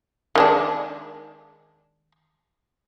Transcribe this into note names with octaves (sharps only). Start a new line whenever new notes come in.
D#3 G#3 D4